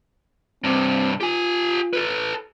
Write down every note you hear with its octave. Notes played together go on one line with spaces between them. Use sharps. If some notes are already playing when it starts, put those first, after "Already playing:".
G2 C3 C4
F4 G4 G#5
A4 B4